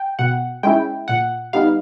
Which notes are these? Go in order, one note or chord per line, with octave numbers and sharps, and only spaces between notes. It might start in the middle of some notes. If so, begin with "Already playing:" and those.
Already playing: G5
B2 F#5
G#3 C#4 E4 G5
A#2 F#5
G3 B3 D#4 F5